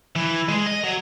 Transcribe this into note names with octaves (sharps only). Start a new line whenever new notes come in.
E3
G#3
D#5
F#3